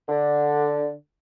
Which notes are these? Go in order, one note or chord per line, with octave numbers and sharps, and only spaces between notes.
D3